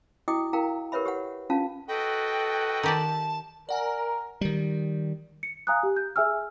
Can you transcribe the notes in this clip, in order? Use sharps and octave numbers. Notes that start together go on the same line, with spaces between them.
E4 F#4 D#5 G5 D6 D#6
E4 A#4 F5 G5 A#5
G4 A#4 B4 C#5 E5 B5
G4 C#5 F#5
C#4 D4 F4 F5 A5
F#4 A4 B4 D#5 G5
D#3 G4 D5 A5
A#4 D5 F#5 G#5
D#3 G3
C#7
F5 G#5 A#5 D#6 F#6
G4
G6
G#4 E5 G#5 E6 F6